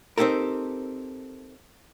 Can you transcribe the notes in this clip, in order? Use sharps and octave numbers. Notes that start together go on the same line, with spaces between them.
C4 D#4 G4 A4 A#4